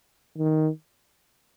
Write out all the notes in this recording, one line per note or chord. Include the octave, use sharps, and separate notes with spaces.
D#3